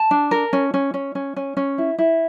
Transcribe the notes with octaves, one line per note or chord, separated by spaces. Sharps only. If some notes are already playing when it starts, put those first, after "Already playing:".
Already playing: A5
D4
A#4
C#4
C#4
C#4
C#4
C#4
C#4
E4
E4